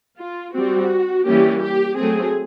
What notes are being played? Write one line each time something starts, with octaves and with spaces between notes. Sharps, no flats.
F4
G3 C4 F#4
E3 G3 A#3 C#4 G4
G4
F#3 A3 C4 G#4